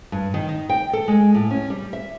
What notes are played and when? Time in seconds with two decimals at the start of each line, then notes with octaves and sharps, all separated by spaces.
0.12 G2
0.34 D#3
0.49 D#4
0.69 G5
0.93 A4
1.08 G#3
1.34 A2
1.51 C#4
1.70 G3
1.93 E5